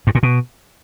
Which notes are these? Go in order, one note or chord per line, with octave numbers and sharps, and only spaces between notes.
G2
A#2
B2